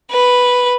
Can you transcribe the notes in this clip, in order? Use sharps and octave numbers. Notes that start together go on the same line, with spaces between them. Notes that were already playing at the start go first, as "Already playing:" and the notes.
B4